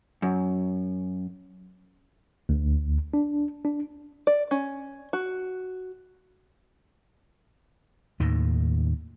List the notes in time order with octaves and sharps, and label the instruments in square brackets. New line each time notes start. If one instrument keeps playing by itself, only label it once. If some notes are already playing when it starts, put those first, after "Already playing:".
[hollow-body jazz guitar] F#2
[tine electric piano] D2
D4
D4
[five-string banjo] D5
C#4
F#4
[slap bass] D#2 A2 D#3